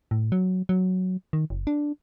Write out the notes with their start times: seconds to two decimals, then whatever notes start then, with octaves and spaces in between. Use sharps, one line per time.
0.11 A2
0.32 F#3
0.69 F#3
1.33 D#3
1.50 F#1
1.67 D4